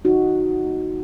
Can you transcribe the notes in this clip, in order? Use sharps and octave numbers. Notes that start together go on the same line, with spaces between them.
D#3 D#4 F#4
D#3
A#3